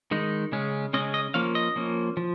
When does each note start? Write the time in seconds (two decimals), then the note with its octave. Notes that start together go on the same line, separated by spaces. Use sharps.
0.11 D#3 G#3 D#4
0.52 C#3 G#3 C#4
0.93 C#3 G#3 C#4 D#5
1.14 D#5
1.34 F3 A#3 C#4 F5
1.55 D#5
1.76 F3 A#3 C#4
2.17 F3